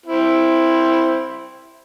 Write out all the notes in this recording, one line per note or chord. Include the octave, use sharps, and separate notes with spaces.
C4 E4